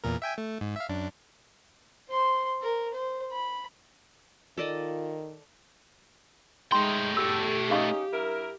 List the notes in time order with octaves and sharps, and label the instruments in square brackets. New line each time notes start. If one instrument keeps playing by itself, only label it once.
[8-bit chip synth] E2 A#2 A#4
E5 G5 G#5
A3
G#2
E5 F5
F#2 D4
[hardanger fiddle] C5 C6
A#4
C5
B5
[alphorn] D#3 [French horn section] F4 [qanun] A4 D5 D#5
[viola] G#3 [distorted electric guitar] A3 G5 [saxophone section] D#4 [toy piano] C6
[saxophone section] E2 D4 A4 [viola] G4 [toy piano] E6
[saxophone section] C#4 D#4 [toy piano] G#4 F5 C#6
[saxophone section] G2 E4 A#4